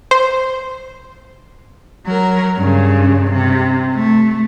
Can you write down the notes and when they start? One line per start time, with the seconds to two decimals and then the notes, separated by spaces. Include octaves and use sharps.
0.11 C5
2.06 F#3 A#4
2.57 G2 C#3
3.31 C3
3.94 A3